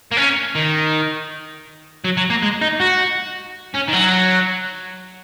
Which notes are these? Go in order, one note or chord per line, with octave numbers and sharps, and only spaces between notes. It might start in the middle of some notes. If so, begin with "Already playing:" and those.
A#3
C#4
D#3
F#3
F#3
A#3
G#3
D#4
F#4
C#4
D#3
F#3